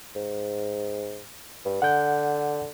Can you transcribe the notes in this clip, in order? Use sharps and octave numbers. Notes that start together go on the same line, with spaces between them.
G#2
G2
D3 F#5 G6